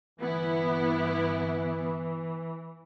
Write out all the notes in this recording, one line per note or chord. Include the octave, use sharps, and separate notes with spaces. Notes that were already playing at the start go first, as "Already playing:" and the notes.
G1 E3 B3 E4